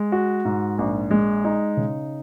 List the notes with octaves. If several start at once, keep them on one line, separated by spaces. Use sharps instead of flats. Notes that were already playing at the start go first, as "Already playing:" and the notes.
Already playing: G#3
F#4
G#2
A#1
G#3
D#4
C#3